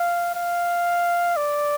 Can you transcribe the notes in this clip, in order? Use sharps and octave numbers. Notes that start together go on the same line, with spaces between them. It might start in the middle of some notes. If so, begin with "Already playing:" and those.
Already playing: F5
F5
D5